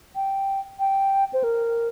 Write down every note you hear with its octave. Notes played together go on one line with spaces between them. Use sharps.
G5
G5
C5
A#4